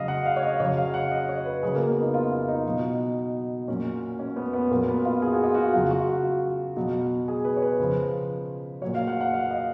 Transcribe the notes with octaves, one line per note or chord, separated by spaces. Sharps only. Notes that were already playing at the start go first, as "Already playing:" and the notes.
Already playing: C#3 F#3 D#5 F5
F#5
F5
C#5
D#5
C#3 F#3 C#5
F5
F#5
D#5
C#5
B4
C#3 F#3 G#4
A#3
B3
D#4
F4
F4
D#4
B2 F#3
A#2 F#3 C#4
C#4
B3
B3
A#2 F#3 A#3
B3
F4
G#4
F#4
F4
F#4
C#3 F#3 F4
F#4
F4
F#4
B2 F#3
G#4
B4
C#5
B4
C#3 F3
A#2 F#3 C#5
F5
F#5
F#5
F5
D#5